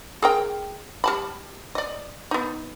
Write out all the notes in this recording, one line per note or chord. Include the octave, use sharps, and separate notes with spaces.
G#4 A#4 G5
G3 A5 B5
D5 D#5
B3 D#4